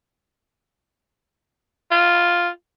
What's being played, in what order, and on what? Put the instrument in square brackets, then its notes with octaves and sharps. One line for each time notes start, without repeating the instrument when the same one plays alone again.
[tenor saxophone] F4